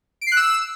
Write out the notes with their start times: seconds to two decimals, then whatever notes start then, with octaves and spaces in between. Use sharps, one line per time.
0.21 D7
0.27 C7
0.32 F#6
0.37 E6